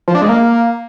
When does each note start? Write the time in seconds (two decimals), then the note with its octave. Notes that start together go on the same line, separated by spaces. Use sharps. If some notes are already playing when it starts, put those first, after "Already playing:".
0.08 F3
0.15 D4
0.22 G#3
0.29 A#3